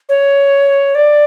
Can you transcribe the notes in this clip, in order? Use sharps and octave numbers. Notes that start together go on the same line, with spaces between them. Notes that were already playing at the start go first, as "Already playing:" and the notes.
C#5
D5